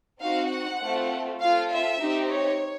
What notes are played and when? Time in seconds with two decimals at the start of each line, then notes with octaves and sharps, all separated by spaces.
0.21 C4 D#4 F#4 F5
0.50 F#5
0.80 A3 C4 F4 A4
1.41 C4 F4 A4 F5
1.72 E5
2.01 C4 D#4 G4
2.31 C#5